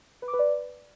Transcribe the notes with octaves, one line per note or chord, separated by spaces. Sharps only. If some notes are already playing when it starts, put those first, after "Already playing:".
B4
D6
B4
D5